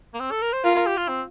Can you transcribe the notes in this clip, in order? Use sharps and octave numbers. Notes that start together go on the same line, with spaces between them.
A#3
C4
A4
A#4
C5
F4 A#4
A#4
G4
F4
C4